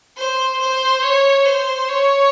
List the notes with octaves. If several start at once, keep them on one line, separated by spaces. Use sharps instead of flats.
C5
C5
C#5
C5
C#5